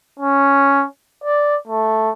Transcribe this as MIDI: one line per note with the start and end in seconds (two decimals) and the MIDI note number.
0.20 0.84 61
1.24 1.55 74
1.68 2.11 57